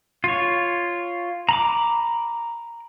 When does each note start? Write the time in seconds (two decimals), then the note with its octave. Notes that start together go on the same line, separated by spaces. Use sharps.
0.24 F4 C#5
1.49 A#5 B5 D6